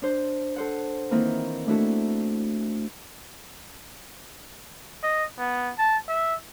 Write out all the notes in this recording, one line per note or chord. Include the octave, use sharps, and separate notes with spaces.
D4 C5
A4 C5 F#5
D#3 E3 A#3 C4 D#4 E4
A3 D4 E4 F#4 A4
D#5
B3
A5
E5